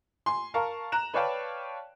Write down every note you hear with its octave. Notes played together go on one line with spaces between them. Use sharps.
G#5 C6
A#4 F5 A5 A#5 C#6
A#5 F#6 E7
B4 C#5 D5 F5 G5 A5